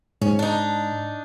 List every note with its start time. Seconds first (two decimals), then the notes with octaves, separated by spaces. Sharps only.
0.22 G#2 C#4
0.39 D4 D#4